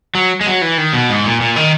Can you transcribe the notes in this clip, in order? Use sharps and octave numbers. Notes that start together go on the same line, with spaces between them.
F#3
G#3
F#3
E3
D#3
B2
G#2
A#2
A#2
D#3